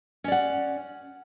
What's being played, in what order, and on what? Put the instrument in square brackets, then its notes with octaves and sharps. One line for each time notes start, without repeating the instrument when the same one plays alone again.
[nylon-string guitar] C#4
D5
F#5